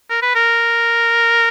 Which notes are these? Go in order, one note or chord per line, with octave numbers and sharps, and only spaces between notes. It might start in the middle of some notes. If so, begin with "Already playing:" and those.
A#4
B4
A#4